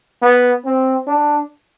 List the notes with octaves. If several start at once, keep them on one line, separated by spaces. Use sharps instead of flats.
B3
C4
D4